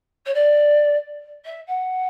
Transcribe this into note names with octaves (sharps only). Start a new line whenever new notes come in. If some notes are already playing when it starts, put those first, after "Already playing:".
C#5
D5
E5
F#5